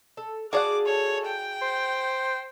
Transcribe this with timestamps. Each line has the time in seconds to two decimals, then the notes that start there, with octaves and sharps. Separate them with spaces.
0.17 A4
0.53 F#4 G#4 D5 F5 F#5 A5 D6
0.86 A4 C#5
1.25 G5
1.62 C5